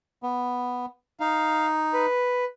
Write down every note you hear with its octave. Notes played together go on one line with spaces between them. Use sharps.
B3
D#4 F5
B4